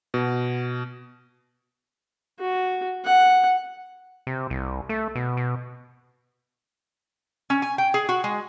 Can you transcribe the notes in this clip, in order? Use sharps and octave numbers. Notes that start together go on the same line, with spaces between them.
B2
F#4
F#5
C3
C2
A3
B2
B2
C#4
G#5
G5
G#4
F#4
G#3